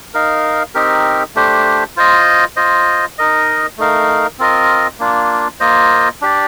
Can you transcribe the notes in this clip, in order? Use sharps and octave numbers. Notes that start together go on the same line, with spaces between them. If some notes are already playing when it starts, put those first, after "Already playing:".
D#4 A#4 F5
C4 D#4 G4 A#4
A3 D4 G4 C5
F4 C5 D#5
F4 C5 D#5
D#4 A#4 D#5
A3 D#4 A#4 F5
C4 F4 A#4 D#5
A#3 D4 F4
A#3 F4 C5 D#5
D4 G4 D5